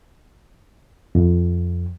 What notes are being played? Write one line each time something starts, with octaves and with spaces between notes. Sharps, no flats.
F2